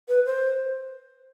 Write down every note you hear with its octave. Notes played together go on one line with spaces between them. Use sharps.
B4
C5